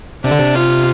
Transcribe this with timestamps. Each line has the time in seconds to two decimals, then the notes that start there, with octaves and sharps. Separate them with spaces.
0.24 C3 D4
0.31 D3
0.39 C3
0.56 F4